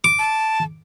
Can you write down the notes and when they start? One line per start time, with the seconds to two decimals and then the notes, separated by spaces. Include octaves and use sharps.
0.04 D6
0.19 A5